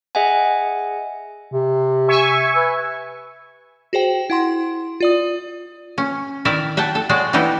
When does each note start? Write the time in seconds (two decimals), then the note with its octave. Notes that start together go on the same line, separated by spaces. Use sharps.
0.15 G#4 D#5 E5 F#5 G#5
1.53 C3
2.08 E5 G#5 C#6
2.56 B4
3.93 F#4 G#4 C5 G5
4.30 E4 F#5 C6
5.00 F4 D5 D#6
5.98 C#4
6.45 D#3 E4 A#4 D5 E5
6.77 E5 F#5 G5 A5
6.95 A4
7.09 G#3 F#4 G#4 C#5 D5
7.33 E3 G3 B3 D#4 E4